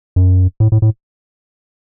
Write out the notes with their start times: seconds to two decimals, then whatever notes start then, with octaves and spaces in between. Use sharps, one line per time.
0.16 F#2
0.60 A2
0.72 A2
0.82 A2